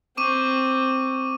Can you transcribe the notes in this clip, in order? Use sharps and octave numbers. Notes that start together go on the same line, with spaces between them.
C4 C#6 D6 D#7